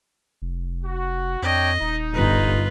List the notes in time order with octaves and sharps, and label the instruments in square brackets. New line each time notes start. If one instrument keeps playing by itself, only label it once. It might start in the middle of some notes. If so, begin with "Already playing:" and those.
[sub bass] F1
[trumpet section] F#4
[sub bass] F2 [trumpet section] D4 C#5 G5 [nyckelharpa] D#5
[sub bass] D#1 [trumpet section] D#4
[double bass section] G1 [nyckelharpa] F4 B4